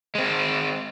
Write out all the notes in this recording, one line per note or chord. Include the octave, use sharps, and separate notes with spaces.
G#3 C4